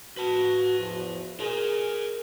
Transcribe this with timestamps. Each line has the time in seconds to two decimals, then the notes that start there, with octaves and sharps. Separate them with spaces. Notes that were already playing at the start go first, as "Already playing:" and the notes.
0.17 F#4 B4 A5
0.79 E2 F3
1.40 G#4 A#4 D5